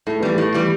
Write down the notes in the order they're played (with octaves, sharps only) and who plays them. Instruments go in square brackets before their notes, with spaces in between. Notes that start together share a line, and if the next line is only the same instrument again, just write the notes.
[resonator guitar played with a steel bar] A2 [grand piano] A3
[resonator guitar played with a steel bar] E3 G3 [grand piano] B3
[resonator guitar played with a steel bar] A2 [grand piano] A3
[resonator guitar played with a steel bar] E3 G3